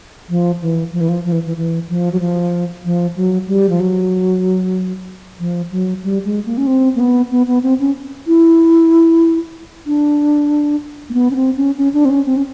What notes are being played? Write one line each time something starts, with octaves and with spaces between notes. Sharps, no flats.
F3
E3
F3
E3
F3
F3
E3
E3
E3
F3
F#3
F3
F3
F#3
G3
F3
F#3
F3
F#3
G3
G#3
A#3
C#4
C4
A#3
B3
B3
B3
C4
C#4
E4
D4
A#3
B3
C#4
C4
C#4
C#4
D4
C4
C#4
C4
C#4